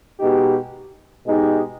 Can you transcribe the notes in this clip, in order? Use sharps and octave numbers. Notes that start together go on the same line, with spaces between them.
B2 G#3 D#4 G4
B2 G#3 D#4 G4